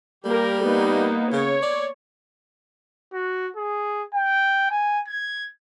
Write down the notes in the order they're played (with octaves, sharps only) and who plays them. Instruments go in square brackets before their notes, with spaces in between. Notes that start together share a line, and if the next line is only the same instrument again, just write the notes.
[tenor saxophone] G3 [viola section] A#3 G4 A#4
[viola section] A#3 B3 D#4
[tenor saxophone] C#3 [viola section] C#5
[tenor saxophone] D5
[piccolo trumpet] F#4
G#4
G5
G#5
G#6